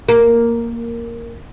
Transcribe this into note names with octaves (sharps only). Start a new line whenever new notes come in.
A#3